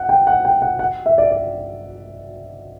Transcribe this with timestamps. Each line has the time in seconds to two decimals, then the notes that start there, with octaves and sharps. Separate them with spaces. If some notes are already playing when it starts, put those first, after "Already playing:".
Already playing: F#5
0.09 G5
0.27 F#5
0.45 G5
0.62 F#5
0.79 F#5
1.06 E5
1.18 D5
1.31 D5